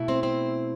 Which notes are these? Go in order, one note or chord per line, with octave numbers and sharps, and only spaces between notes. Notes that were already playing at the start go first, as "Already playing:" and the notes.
Already playing: B2 A3 E4
C4 C5
C4 C5